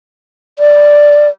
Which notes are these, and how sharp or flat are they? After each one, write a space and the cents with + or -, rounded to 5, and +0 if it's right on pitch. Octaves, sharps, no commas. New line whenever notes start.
D5 +0